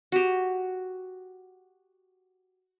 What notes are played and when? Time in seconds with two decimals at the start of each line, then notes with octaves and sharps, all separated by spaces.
0.12 F#4 G4